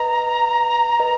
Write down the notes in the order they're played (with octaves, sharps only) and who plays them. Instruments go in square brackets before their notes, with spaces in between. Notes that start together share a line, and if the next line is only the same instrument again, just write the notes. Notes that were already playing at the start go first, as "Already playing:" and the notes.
Already playing: [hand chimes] B4 D#5 [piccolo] A#5
[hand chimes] B4 D#5